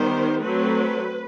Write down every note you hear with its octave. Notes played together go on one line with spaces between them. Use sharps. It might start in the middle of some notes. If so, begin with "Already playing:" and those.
Already playing: D#3 G3 B3 C5
F#3 A3 C4 B4